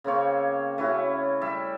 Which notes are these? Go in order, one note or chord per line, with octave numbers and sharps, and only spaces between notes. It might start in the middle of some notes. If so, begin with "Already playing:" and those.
C#3 A#3 C4 C#5
A3 C#4 E4 F#4
G3 E5